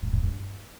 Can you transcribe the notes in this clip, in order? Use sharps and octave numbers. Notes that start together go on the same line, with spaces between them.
A2
A2
G2